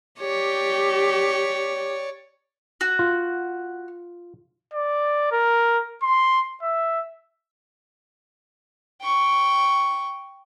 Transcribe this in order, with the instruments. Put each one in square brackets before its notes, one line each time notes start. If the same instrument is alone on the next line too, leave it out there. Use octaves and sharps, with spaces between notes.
[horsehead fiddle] G4 [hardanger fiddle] C#5 D5
[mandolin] F#4
[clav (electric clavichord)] F4
[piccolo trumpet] D5
A#4
C6
E5
[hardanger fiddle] G5 C#6